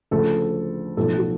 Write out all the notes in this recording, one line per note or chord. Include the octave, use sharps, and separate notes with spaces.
D2 C#3 F3 A3 A4
B1 A2 F3 A4
F#4